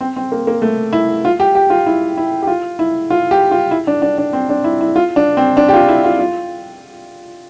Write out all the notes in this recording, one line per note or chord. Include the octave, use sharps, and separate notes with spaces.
C4
C4
A#3
A#3
A3
E4
F4
G4
G4
F4
E4
E4
G4
F4
E4
F4
G4
F4
E4
D4
D4
D4
C4
D4
E4
E4
F4
D4
C4
D4
G4
F4
E4
F4
F4